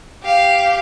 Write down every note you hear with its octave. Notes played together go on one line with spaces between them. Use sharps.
G4 F5